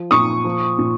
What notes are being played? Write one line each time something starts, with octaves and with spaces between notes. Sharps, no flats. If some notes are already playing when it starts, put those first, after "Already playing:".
Already playing: F3
A#2 C#6 D#6
F3
A#2